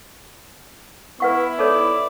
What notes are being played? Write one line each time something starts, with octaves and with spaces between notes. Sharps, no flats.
B3 E4 B4 F#5 C#6
D#4 A4 C#5 D5